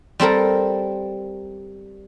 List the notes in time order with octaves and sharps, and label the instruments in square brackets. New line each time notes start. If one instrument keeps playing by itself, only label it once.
[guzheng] G3 C4 A4 A#4